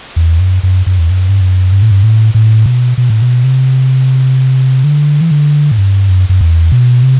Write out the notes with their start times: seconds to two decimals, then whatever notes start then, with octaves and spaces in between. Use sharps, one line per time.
0.16 E2
0.40 F#2
0.63 F#2
0.86 F#2
0.99 E2
1.10 F#2
1.29 G2
1.41 F#2
1.72 G2
1.82 A2
1.91 G2
2.03 A2
2.34 A2
2.66 B2
2.98 B2
3.10 A2
3.22 B2
3.44 C3
4.84 D3
5.21 E3
5.31 D3
5.71 A2
5.78 G2
6.09 F#2
6.29 F#2
6.41 E2
6.72 B2
7.03 C3